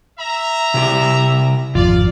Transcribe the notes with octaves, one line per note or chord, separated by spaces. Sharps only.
E5 A#5
C3 E4 G4
G#1 F2 F4 D5